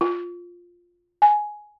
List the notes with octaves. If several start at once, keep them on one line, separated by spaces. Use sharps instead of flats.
F4
G#5